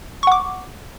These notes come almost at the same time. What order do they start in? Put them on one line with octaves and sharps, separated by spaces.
C#6 F#5 D6